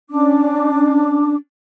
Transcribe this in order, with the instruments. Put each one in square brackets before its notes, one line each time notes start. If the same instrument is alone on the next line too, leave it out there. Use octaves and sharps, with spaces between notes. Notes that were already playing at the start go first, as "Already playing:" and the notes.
[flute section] C#4 D4 D6